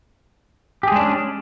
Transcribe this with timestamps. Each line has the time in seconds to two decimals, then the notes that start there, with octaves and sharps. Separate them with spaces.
0.83 G4
0.88 G#4
0.92 G#3
0.96 D4
1.00 C#4